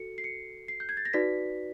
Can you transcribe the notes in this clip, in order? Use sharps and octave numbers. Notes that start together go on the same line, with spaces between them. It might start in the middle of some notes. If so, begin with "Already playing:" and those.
Already playing: F#4 A4 C#7
C7
C#7
C7
G6
G#6
A6
A#6
D#4 F#4 B4 D5 B6